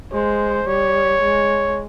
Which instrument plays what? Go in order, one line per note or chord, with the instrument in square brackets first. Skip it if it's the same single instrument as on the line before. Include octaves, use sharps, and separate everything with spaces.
[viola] G#3 [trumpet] C5
[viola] G3 [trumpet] C#5
[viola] G#3